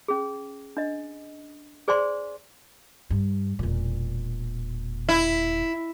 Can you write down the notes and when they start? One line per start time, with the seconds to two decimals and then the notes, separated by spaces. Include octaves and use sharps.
0.08 C#4 G#4
0.77 D4 D#5
1.88 G#4 C5 D5 G#5 C6
3.11 G2
3.59 E1 A#2
5.09 E4